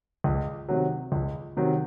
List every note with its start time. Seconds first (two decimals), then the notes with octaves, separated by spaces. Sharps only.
0.24 C#2
0.68 C3 D#3 F#3
1.12 C#2
1.57 C3 D#3 F#3